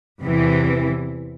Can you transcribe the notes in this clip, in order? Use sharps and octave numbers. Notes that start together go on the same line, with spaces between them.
E2 C3 E3